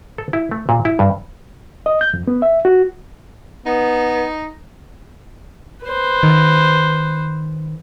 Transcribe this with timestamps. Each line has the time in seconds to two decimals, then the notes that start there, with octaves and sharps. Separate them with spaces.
0.18 A4
0.33 E4
0.51 A3
0.69 A#2
0.85 E4
0.99 G2
1.86 D#5
2.01 G6
2.14 F2
2.27 B3
2.42 E5
2.65 F#4
3.66 B3 D#4
5.85 B4 C5
6.23 D#3